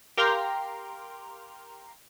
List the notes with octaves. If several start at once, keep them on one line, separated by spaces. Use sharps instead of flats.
G4 A#4 F5 G5 A#5 C6